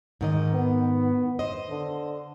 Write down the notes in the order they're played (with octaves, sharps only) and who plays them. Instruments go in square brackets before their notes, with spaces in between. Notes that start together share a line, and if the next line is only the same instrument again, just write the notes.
[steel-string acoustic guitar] G#2 D#3 D#5
[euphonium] B3
[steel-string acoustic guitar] C5 D#5
[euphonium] D3